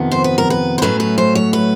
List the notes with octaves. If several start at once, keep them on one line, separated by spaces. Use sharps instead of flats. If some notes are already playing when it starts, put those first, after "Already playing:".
Already playing: F2 C3 D#3 B3
C5
B4
A#4
B4
C5
A2 F#3 A3 C#4 B4
B4
C5
C#5
B4